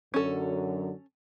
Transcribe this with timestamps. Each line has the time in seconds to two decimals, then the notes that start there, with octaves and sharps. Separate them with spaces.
0.14 F#2 D3 F#3 C#4 A4